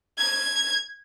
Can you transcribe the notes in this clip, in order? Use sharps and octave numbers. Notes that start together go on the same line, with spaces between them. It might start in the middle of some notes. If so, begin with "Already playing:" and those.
G#6